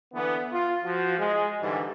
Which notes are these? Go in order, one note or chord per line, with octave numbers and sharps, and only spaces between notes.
D3 E3 B3
F4
F3 F#4
G#3
G#2 D3 E3 G3